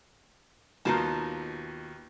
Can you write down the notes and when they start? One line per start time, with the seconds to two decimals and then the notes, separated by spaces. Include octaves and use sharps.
0.85 D#2 B2 D#4 F4 A5